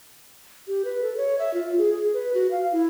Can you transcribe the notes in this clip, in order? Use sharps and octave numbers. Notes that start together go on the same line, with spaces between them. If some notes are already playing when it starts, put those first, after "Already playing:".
G4
B4
A4
C#5
E5
F4
G#4
G#4
B4
F#4
F5
E4